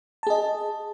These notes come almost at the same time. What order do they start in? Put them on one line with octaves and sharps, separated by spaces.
A5 G#4 D#5